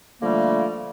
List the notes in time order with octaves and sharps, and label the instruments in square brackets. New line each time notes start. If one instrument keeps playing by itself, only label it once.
[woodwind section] D3 F3 G3 A3 A#3